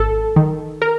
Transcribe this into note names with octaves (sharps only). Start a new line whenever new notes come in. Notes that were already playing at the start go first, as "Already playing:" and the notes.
Already playing: G#1 A4
D#3
A#4